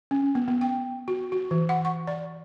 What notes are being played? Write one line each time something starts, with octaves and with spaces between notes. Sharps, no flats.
C#4
B3
B3
G5
F#4
F#4
E3
F#5
C#6
D5